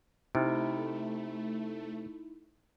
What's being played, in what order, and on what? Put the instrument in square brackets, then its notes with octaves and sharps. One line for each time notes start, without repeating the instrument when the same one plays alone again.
[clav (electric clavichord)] C3 [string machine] A3 [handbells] D#4 E4 D7